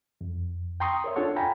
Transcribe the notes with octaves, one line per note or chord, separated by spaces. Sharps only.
F2
G5 A#5 C6 C#6 D#6
A#4 C#5 E5
D4 F4 A4 C#5 F#5 C#6
F5 G5 G#5 A#5 B5